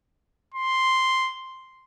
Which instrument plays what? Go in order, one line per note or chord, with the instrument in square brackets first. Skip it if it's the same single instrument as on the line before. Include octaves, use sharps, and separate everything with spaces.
[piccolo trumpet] C6